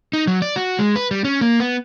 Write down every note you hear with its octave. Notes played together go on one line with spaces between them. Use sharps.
D#4
F#3
D5
F#4
G#3
B4
G3
C#4
A#3
B3